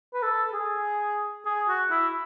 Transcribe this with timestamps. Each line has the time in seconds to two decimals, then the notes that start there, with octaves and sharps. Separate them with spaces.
0.14 B4
0.23 A4
0.53 G#4
1.46 G#4
1.69 F#4
1.91 E4